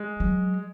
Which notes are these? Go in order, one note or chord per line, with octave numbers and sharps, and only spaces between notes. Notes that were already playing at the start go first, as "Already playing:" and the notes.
Already playing: G#3
F#3